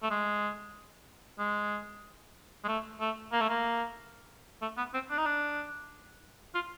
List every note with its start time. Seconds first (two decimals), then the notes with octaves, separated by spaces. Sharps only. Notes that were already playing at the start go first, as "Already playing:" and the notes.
0.03 A3
0.11 G#3
1.39 G#3
2.64 G#3
2.68 A3
3.00 A3
3.33 A#3
3.41 A3
3.49 A#3
4.62 A3
4.78 B3
4.94 C4
5.10 D4
5.18 D#4
5.26 D4
6.55 F4